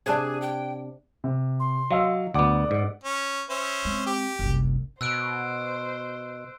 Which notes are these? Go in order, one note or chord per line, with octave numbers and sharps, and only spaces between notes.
C3 D4 G#4 A5 F#6 G#6
G5
C3
C6
F#3 D#5 F5 E6
D2 B3 D5 F#5 D6
G#2
C#4
C#4 C5 E5
G#3 C4
G4
F#1 C2
B2 C5 E6 F#6 D7